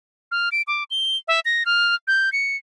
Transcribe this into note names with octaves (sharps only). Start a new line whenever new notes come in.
F6
D7
D6
G7
E5
A#6
F6
G6
C#7